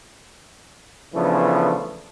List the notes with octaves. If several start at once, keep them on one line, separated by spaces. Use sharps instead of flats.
C#3 E3 F3 A3 B3 D4